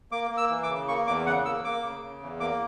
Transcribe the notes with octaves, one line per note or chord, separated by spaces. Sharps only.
A#3 D6
A#3
E6
E3
D6
C#3
A#3 C#6
E2 D6
C#3 F#5
A#3 E6
A#3 D6
C#3
C#3
E2
A#3 D6